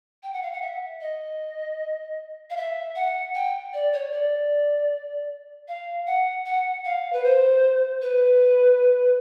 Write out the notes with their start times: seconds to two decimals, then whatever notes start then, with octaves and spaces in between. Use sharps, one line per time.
0.23 G5
0.33 F#5
0.42 F5
0.52 F#5
0.62 E5
1.01 D#5
2.50 F5
2.57 E5
2.95 F#5
3.34 G5
3.73 D5
3.93 C#5
4.12 D5
5.68 F5
6.07 F#5
6.45 F#5
6.85 F5
7.12 B4
7.24 C5
8.01 B4